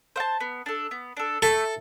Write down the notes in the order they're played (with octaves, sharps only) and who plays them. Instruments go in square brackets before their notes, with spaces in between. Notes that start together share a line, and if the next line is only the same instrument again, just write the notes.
[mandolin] C5 F#5
A5
B3
D4 A4
B3
D4 A4
[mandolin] A3 [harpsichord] A4